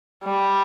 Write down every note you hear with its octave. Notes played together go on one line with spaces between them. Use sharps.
G3